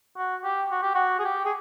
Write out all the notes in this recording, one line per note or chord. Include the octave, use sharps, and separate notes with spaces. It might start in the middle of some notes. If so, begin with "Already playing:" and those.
F#4
G4
F#4
G4
F#4
G#4
G4
G#4